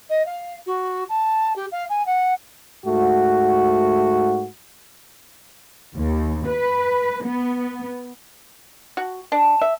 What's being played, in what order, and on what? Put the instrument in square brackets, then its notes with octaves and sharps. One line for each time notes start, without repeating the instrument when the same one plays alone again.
[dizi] D#5
F5
F#4
A5
G4
F5
G#5
F#5
[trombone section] G#2 A3 F#4
[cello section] D#2
B4
B3
[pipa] F#4
D4
E5